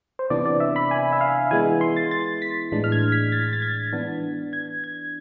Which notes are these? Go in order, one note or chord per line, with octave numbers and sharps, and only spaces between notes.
C5
C3 E3 B3 D4 D5
D5
E5
B5
G#5
E5
F5
E3 G#3 B3 E4 G#5
C6
A6
A6
B6
A2 E3 G#3 D4
F6
G#6
B6
A6
A6
G#6
E3 B3 D4
G#6
G#6